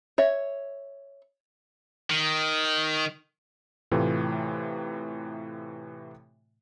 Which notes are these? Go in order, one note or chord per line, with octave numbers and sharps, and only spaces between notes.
C#5 E5
D#3
A2 C3 E3 A3 F4